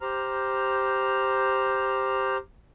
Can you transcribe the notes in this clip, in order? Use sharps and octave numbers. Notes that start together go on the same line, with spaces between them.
G4 C5 A#5 F6